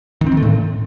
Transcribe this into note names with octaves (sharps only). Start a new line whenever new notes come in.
D#3
C4
D#3
A3
A2